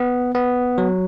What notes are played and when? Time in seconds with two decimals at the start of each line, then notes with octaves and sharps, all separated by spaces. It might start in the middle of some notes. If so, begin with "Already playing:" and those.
Already playing: B3
0.35 B3
0.78 F#3